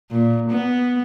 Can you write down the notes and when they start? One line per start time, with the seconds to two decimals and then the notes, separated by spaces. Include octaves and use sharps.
0.11 A#2
0.50 B3